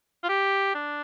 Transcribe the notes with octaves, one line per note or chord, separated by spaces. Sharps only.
F4
G4
D4